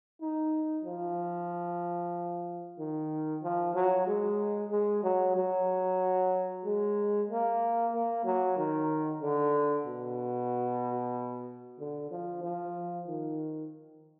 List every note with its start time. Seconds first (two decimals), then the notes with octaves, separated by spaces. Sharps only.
0.21 D#4
0.85 F3
2.79 D#3
3.43 F3
3.75 F#3
4.07 G#3
4.71 G#3
5.03 F#3
5.36 F#3
6.65 G#3
7.29 A#3
7.93 A#3
8.25 F#3
8.57 D#3
9.21 D3
9.86 B2
11.79 D3
12.11 F3
12.43 F3
13.08 D#3